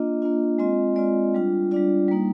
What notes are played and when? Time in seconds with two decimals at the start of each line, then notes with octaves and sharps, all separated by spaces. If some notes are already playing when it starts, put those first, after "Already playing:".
Already playing: A#3 D4 F4 D#5
0.22 A#3 D4 F4
0.58 G#3 C4 F4 D#5
0.96 G#3 C4 F4 D5
1.34 G3 D4 F4
1.71 G3 D4 F4 D5
2.08 G3 A#3 D#4